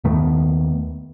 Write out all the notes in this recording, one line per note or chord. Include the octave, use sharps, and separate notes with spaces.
D#2 D#3 A3 B3